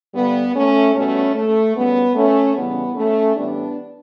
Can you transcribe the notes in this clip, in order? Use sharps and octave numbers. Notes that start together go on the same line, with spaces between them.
G2 D3 G3 B3
A3 C#4
B2 G3 A3 C#4
A3
F#2 C#3 G3 B3
A3 C#4
E2 C#3 E3 G3 B3
A3 C#4
A2 E3 G3 B3 D4